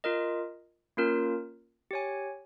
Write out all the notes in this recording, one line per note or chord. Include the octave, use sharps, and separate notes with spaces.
F4 A#4 D#5
A#3 C#4 F4 A#4
G4 C#5 G#5